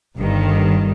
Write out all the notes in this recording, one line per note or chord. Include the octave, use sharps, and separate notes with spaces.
G1 G2 D#3